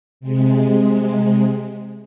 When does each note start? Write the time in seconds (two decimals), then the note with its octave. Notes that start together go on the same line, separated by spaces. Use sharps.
0.20 C3 G#3